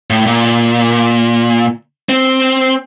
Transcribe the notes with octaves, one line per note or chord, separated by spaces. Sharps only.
A2
A#2
C4